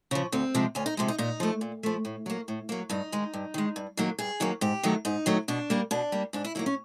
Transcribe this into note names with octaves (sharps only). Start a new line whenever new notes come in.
C#3 F3
D2 C4
C3 F3 G#3
D2 C#4
D#4
C3 F3 G#3
D#4
A#2 D#4
F3 A3
A#2
F3 A3
A2
F#3 A#3
A2
F#3 A#3
G2 D#4
D#3 G#3
G2
D#3 G#3
G2
D#3 F#3 A#3
G2 G#4
D#3 F#3 A#3
G#2 G4
D#3 F#3 A3
G#2 D#4
D#3 F#3 A3
B2 D4
G3 A#3
B2 D4
G3 A#3
G#2 D4
E4
D#3 F#3 A#3 E4
C#4